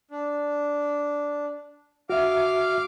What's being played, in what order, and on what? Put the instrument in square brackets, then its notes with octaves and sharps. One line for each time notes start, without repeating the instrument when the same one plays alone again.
[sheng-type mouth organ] D4
[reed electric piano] F#4 E5 [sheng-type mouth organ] F5 D6 F6